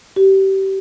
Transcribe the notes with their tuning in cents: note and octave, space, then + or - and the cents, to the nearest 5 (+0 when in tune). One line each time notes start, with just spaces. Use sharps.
G4 -25